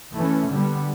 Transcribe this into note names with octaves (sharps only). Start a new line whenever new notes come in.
E3 A3 C#4
D3 G3 B3